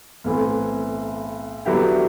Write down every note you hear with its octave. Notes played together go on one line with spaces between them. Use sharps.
B1 A2 E3 A3 C4
D3 F#3 B3 E4 G4